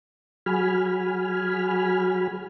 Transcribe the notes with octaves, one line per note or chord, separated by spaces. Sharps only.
F#3 F#4 G#4 G#5 B5 F6